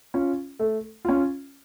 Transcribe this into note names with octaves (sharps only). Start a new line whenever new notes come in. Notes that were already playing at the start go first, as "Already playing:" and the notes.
C#4 F4
A3
C#4 F4